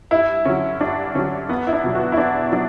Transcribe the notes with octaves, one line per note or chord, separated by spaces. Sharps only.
G2 E4
D3 F#3 C#4
G2 D4
D3 F#3 C#4
E2 B3
E4
D4
B2 F#3
F#4
E4
E2 D4
F#3 D4